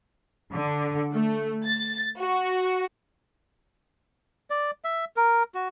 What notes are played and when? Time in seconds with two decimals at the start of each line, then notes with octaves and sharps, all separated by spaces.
0.52 D3
1.12 A3
1.66 A6
2.19 F#4
4.50 D5
4.84 E5
5.17 A#4
5.55 F#4